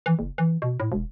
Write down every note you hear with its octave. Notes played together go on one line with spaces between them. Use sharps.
E3
F#1
E3
B2
A2
E1